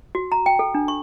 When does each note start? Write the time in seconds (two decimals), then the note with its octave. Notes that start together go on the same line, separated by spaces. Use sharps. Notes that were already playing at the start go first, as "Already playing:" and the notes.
0.15 F#4
0.32 A#5
0.46 G5
0.59 A4
0.75 D4
0.88 C#6